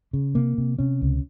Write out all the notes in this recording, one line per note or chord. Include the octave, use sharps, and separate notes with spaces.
C#3
C3 A#3
C3
C3 C#4
C#2